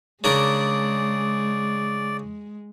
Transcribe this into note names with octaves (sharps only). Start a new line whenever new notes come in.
C#3 G#3 D4 A#4 D5